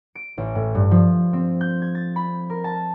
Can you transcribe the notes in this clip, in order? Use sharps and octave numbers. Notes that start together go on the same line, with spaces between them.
D7
A1
A2
G2
F3
C4
G6
G#6
A6
B5
A#4
A5